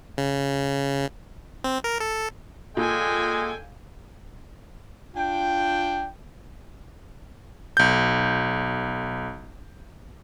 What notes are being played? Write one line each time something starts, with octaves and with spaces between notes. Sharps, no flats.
C#3
C4
A#4
A4
A#2 G#3 A4 G5 G#5
D4 F4 G5
B1 G6